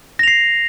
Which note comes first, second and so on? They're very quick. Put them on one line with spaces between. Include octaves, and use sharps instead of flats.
A#6 F7 C7